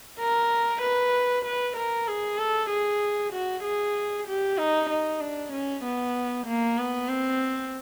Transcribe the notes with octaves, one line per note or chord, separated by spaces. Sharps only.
A#4
B4
B4
A#4
G#4
A4
G#4
F#4
G#4
G4
D#4
D#4
D4
C#4
B3
A#3
B3
C4